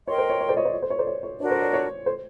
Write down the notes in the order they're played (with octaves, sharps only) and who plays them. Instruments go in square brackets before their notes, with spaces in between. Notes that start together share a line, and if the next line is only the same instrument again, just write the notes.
[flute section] A#4 D#5 G5 C6 [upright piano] C#5
[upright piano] C5
C#5
C#5
C5 D5
C#5 D#5
C5 D5
C#5
C5
C#5
C5 D5
C#5
C#5
[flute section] D4 F#4 A#4 [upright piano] C#5
[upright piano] C5 D5
C#5
C#5
C5